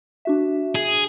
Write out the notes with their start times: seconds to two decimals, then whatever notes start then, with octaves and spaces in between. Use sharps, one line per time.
0.25 D4 F#4 E5
0.75 G#4